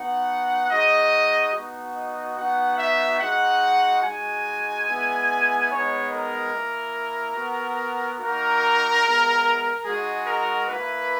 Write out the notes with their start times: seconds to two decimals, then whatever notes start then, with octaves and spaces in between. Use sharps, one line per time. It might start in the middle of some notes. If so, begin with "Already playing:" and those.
Already playing: B3 D#4 F#4 F#5
0.71 G#3 D#4 F#4 D#5
1.53 B3 D#4 F#4
1.95 D#5
2.37 B3 D#4 F#4 F#5
2.78 E5
3.20 G#3 D#4 F#4 F#5
4.03 G#3 D#4 F#4 G#5
4.86 G#3 B3 E4
5.69 G#3 B3 D#4 C#5
6.11 A#4
6.53 A#3 E4
7.36 B3 F#4
8.18 A#3 D#4 F#4 A#4
9.02 G#3 B3 E4
9.85 G#3 D#4 F#4 G#4
10.27 A#4
10.68 A#3 E4 B4